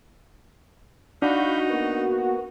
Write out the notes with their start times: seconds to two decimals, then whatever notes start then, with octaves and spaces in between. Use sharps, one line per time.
1.22 D4 D#4 F#4 F5 B5 G6
1.70 A#3 B3